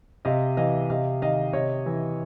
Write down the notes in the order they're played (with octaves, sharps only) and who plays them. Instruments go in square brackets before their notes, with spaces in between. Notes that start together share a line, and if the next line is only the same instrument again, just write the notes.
[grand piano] C3 D#5 F5
E3 D#5 F5
C3 D#5 F5
D#3 D#5 F5
C3 C#5 D#5
E3